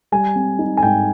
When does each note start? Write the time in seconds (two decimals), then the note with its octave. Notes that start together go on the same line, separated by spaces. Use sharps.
0.12 G3 G#5
0.36 C4
0.59 D#4
0.77 G#5
0.83 G#2 G5